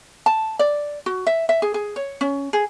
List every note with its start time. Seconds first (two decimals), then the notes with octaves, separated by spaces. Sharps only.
0.26 A5
0.59 D5
1.06 F#4
1.27 E5
1.49 E5
1.62 G#4
1.74 G#4
1.96 C#5
2.21 C#4
2.53 G#4